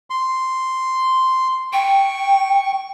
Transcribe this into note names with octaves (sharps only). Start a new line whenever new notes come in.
C6
G5 C#6